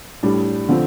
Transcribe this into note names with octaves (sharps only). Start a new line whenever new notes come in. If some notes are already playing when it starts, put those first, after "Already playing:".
A2 G3 D4
D3 F3 A3 C4